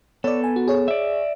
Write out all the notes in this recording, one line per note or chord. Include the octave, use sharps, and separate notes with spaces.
B3 A4 C#5 D5
G#5
F#4
G#4 C#5
D5 E5